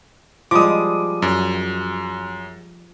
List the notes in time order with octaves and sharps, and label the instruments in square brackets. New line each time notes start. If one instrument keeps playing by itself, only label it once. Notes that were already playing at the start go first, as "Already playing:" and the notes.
[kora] F3 G3 G#3 [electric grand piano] D6 D#6
[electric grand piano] F#2